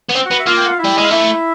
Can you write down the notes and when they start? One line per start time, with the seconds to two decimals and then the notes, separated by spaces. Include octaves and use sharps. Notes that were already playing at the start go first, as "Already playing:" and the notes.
0.09 B3
0.15 C4
0.25 F#4 F#5
0.31 B3
0.39 E5
0.46 A#3 F4 F5
0.57 G5
0.64 F#5
0.71 F5
0.78 E4 E5
0.85 G3
0.98 G#3 F5
1.10 A3 E4 E5